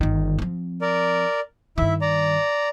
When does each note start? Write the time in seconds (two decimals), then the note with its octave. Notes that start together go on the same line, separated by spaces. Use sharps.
0.01 G1 D#3
0.39 F3 C4
0.81 A#4 D5
1.78 G2 D#3 E4 E5
2.01 D5 A#5